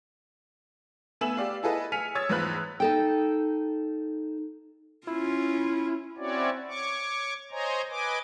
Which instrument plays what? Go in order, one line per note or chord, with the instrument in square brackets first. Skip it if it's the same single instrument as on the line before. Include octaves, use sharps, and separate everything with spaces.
[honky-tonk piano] A3 B3 G#5 E6 E7 F#7
G4 D5 F5
E4 G#4 A4 B4 D#5
G#5 F6 B6 C#7 D#7 F7
C#5 D#6 E6 G#6 A6
E2 G#2 F3 B4 B5 F#6
[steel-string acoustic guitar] D#4 A4 G5
[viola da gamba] C#4 F4 [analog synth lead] E4
[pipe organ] C4 C#4 E4 F#4 C#5 D5
C#5 C#6 D6
C5 C#5 D#5 G#5 A#5
B4 D#5 G#5 D6